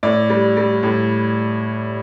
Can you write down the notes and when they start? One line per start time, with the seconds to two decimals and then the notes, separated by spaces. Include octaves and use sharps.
0.03 A2 D5
0.30 G3
0.57 G3
0.83 A2